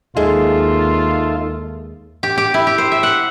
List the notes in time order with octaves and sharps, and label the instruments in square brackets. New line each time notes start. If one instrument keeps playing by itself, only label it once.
[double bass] D#2 [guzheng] G#3 [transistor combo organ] D#4 A4 E5 [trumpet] F4
[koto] G4
G4
E4
G4
C5
E5
F#5